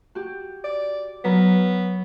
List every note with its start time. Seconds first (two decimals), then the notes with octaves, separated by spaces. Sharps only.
0.15 F#4 G4
0.64 D5
1.24 F#3 B3 A#4